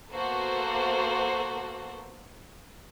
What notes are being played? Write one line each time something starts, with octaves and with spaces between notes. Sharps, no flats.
A#3 B3 F#4 A4 C5